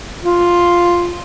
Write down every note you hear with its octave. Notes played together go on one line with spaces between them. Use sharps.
F4